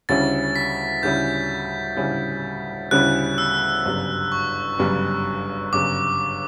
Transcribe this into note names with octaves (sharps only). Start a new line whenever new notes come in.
D2 C#3 G3 C#4 E4 A6
B6
D2 C#3 G3 C#4 E4 G6
D2 C#3 G3 C#4 E4
D2 C#3 G3 C#4 E4 F#6
E6
G1 F#2 C#3 G3
C#6
G1 F#2 C#3 G3
G1 F#2 C#3 G3 D6